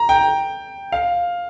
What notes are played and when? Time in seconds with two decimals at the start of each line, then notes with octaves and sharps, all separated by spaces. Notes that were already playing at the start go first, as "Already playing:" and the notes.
Already playing: A#5
0.09 G5
0.92 F5